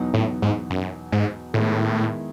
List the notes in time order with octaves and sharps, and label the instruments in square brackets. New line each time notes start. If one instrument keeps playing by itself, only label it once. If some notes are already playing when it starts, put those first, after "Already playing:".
Already playing: [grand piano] E2 B2 F#3 B3 D#4
[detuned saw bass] A2
G#2
F#2
G#2
[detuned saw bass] A2 [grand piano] D#3 G#3 B3 E4